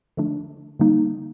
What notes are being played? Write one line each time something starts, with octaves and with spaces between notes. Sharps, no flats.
D3 F3 A3 D4
D3 G3 A#3 D#4